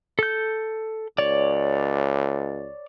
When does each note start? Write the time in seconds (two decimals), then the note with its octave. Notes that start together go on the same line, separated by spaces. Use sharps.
0.19 A4 G6
1.18 C#2 C#5 D5